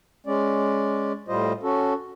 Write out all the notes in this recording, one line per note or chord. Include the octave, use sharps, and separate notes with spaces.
G#3 C#4 D5
A2 G3 F4 C5 D#5
C#4 F#4 A4